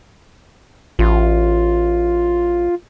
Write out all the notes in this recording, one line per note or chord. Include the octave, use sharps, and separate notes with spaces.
A1 F4